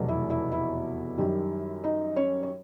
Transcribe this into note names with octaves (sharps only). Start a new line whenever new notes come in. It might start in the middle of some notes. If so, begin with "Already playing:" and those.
Already playing: F1 E2 B2 F#3 A3
E4 E5
E4 E5
E4 E5
F#2 D#3 G3
D#4 D#5
C#4 C#5
C#5